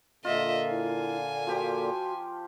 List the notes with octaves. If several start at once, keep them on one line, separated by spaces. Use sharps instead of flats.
A#2 D3 A#3 F4 D#5 E5
E4 G#5
F3 F#4 G4 C5